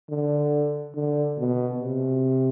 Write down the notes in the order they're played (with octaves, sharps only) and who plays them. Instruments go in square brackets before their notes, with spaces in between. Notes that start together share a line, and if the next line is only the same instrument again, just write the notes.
[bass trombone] D3
D3
B2
C3